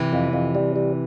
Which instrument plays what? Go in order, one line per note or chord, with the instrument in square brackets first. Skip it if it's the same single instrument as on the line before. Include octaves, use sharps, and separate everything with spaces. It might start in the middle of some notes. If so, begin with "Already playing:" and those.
Already playing: [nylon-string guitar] C3 E3
[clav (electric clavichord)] F2
F2
G3
G3